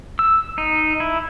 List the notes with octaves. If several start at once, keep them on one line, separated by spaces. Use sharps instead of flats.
E6
D#4
E4